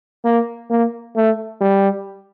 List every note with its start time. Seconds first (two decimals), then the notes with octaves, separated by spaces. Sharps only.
0.25 A#3
0.71 A#3
1.16 A3
1.61 G3